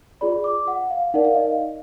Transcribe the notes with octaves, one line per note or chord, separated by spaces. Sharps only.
F4 G#4 D5 B5
D6
F#5
F5
D#4 A#4 D5 F#5
F5
D#5
F5